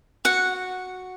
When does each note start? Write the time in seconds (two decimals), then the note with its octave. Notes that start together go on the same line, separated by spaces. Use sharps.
0.25 F#4 F#5